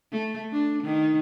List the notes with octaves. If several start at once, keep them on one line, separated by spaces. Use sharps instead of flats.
A3
D4
D#3